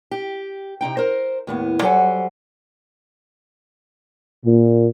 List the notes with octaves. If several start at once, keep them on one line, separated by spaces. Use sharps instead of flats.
G4
C3 D#3 D#4 G5
A#4 C5
D#2 A2 B3
F#3 G3 A4 C5 F#5 G#5
A#2